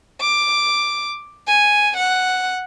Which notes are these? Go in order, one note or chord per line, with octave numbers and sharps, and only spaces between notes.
D6
G#5
F#5